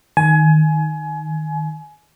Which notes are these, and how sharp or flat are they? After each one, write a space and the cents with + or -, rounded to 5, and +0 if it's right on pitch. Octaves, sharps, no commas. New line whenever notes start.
D#3 +0 G#5 +25